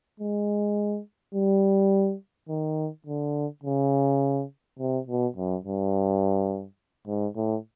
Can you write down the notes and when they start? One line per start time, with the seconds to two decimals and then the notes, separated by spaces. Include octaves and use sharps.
0.20 G#3
1.35 G3
2.49 D#3
3.06 D3
3.63 C#3
4.79 C3
5.07 B2
5.36 F#2
5.65 G2
7.07 G#2
7.36 A2